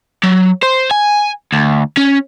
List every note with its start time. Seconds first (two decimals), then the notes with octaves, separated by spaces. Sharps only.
0.23 F#3
0.63 C5
0.91 G#5
1.53 D2
1.97 C#4